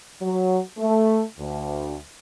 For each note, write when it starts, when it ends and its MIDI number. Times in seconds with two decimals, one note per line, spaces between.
0.21 0.59 54
0.78 1.22 57
1.39 1.96 38